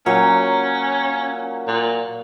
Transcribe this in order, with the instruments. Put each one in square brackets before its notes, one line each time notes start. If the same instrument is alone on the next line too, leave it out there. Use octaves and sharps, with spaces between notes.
[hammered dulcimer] A#2 F#3 F5 [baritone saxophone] C#4
[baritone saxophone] A#2